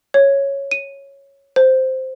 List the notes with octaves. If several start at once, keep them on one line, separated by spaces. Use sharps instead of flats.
C#5
D#7
C5